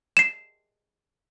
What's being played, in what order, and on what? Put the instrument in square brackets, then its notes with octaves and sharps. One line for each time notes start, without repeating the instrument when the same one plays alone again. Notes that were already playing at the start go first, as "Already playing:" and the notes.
[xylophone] C7 E7